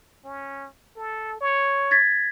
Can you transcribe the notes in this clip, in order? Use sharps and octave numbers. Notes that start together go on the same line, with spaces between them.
C#4
A4
C#5
G#6 A6 B6